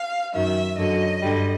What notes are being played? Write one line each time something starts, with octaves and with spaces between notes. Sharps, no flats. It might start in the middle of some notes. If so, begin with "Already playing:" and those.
Already playing: F5
F#2 D#3 F#3 E5
F#2 D3 F#3 D#5
G2 D3 G3